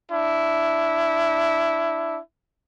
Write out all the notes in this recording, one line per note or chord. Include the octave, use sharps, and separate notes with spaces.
D4 E4